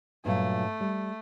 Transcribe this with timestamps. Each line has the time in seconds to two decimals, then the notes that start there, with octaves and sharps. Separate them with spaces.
0.25 G2 A#2 F#3 A3
0.80 G3